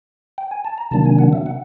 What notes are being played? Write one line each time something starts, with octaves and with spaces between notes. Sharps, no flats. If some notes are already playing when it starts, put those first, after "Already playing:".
G5
G#5
A5
A#5
C3 D#3 F#3 A#3 D4 A5
G#5
F#5
E5
F#5